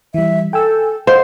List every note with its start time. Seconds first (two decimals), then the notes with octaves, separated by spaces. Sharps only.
0.14 E3 G3 E5
0.53 A4 G5 G#5 E6
1.07 C5 D#5 F5 F#5